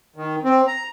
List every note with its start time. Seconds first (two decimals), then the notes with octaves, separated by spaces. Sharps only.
0.16 D#3
0.44 C4
0.67 A#5